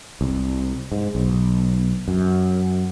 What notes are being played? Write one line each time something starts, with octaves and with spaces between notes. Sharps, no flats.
C2
G#2
B1
F#2